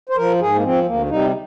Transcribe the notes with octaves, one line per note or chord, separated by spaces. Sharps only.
C5
F3 A#4
G#2 G#4
A#3
F3 C4
D2 A#3
C3 G3 D#4